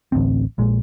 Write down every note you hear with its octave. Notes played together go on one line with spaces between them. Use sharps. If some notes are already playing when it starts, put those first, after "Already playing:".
A1 D2 C4
A#1 A#2 G#3